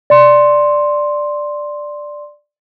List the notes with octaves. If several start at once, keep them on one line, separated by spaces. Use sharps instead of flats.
D5 C6